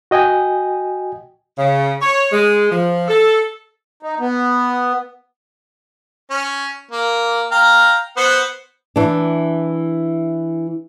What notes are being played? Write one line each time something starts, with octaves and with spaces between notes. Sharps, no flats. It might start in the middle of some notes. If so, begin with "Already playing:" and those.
F#4 D#5 G5 G#5
C#3
C#5
G#3
F3
A4
D#4
B3
C#4
A#3
F5 G5 A#5
B3 C5 F#5
E3 D4